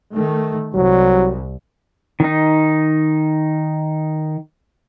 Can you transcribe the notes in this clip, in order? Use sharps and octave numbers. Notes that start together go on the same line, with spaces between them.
D#3 A3
C2 F#3
D#3 D#4